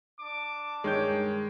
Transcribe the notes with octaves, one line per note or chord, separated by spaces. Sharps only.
D4 A5 D6
G2 D#3 G#3 C#5 G6